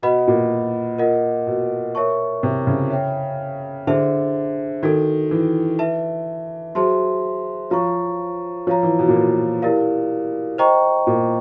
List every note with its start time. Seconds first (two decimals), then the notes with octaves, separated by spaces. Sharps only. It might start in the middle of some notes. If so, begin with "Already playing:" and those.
0.02 B2 B4 D#5 F#5 B5
0.28 A#2
0.99 F4 A#4 D#5 F#5
1.47 B2
1.95 A#4 C#5 E5 A5 C#6
2.43 C3
2.67 C#3
2.91 C#5 E5 G5
3.87 D3 G#4 C5 E5 A5
4.83 D#3 D#4 F#4 A4
5.31 E3
5.79 B4 E5 A5
6.75 F#3 G#4 C5 E5 A5 C6
7.70 F3 C#5 F5 A#5 C#6
8.67 F3 C#5 F5 A#5
8.83 E3
8.99 B2
9.09 A#2
9.15 B2
9.62 E4 G4 A#4 D5 F5
10.58 C5 D#5 G5 A#5 C#6
11.07 A#2